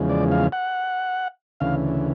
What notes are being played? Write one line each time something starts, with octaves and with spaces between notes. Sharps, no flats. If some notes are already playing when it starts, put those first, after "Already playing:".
Already playing: E2 C#3 F3 G#3
D5
F5
F#5
D2 C#3 E3 F5